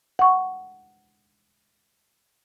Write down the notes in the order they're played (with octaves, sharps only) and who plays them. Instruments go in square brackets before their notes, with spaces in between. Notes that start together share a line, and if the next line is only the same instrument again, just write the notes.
[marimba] F#5 C#6